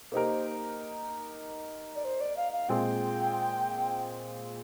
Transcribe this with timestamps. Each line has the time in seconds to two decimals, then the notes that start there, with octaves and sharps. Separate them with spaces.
0.12 A#3 D#4 G4 A#4 C5
1.96 D5
2.05 C5
2.21 D5
2.37 F5
2.53 F5
2.69 A#2 G#3 C4 F4 G#4 G5